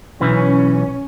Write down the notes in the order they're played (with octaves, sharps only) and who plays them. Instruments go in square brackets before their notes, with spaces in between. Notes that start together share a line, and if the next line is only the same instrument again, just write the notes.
[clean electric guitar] B1 E3 [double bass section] C#4